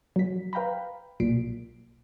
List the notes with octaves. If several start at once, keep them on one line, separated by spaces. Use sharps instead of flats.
F#3 B6
B4 F5 G5 A#5 B5
B1 A#2 B6 C7 D7